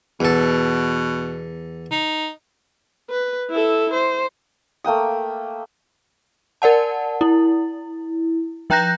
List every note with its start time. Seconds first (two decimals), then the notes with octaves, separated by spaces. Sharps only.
0.20 E2 B2 A4
1.91 D#4
3.10 B4
3.50 E4 A4
3.93 C5
4.84 A3 A#3 G5 D#6
6.62 A#4 D5 F#5 A5
7.21 E4
8.70 F3 G5 A#5 F#6 G6 A#6